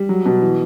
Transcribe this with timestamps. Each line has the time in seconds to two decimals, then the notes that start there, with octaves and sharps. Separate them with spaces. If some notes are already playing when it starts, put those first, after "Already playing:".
Already playing: G3
0.09 F#3
0.25 B2
0.42 E3